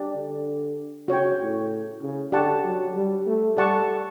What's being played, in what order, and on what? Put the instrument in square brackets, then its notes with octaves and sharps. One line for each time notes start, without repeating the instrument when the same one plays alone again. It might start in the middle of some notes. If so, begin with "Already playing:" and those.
Already playing: [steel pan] D4 G4 D5
[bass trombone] D3
[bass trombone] C#3 [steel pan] F#4 C#5 G5
[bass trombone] A2
C#3
[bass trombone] D3 [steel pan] G4 D5 F#5 A5 C#6
[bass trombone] F#3
G3
A3
[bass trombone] G3 [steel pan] A4 D5 F#5 A5 C#6